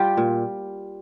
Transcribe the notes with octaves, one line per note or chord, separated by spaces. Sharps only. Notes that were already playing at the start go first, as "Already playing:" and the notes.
Already playing: G3 F4 G4
A#2